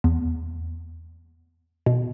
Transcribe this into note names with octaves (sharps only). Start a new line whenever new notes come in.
E2
B2